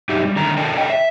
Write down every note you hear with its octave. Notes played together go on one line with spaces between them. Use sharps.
F#2 D#4 G4 E5
G3
D3 D#3 A3 A#5
A4 A#4 D5 D#5 G5 A5
A4 C#5 D#5 G5
E5